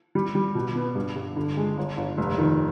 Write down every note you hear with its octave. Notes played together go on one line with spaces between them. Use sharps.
G3
G3
B2
B3
G2
G2
D3
G#3
G1
G1
F1
D#3